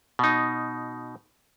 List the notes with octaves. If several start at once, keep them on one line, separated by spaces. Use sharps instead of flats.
B2 D#4